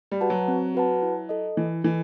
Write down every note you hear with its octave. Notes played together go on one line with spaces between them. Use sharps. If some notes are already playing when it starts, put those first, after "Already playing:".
G3
F#4 B4 F#5 A5
F#3
C4
F#4 B4 F#5 A5
E4
A4 D#5
E3 E4
E3 A4 D#5